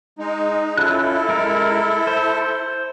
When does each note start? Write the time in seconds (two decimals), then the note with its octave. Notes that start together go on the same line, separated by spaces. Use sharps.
0.19 G#3 D#4
0.77 C#4 E4 F4 A4 F#6
1.29 G#3 A#4
2.07 C5